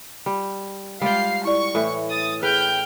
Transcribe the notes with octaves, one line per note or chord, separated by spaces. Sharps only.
G3
G3 G#3 F4 F5 G5 C7
E4 D5 C#6
A2 E3
D#6 A6
G#4 B4 G5 F6 G6